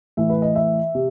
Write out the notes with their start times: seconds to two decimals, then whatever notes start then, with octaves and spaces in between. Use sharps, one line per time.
0.17 A2 E3 E5
0.30 B4
0.42 D#5
0.55 E5
0.95 C3